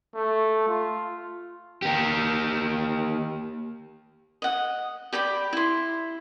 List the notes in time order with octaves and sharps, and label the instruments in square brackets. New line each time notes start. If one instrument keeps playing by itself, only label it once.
[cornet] A3
F4
[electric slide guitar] A#3 G4
[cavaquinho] D#5 F#5
G4 D5 G5 B5
E4 C6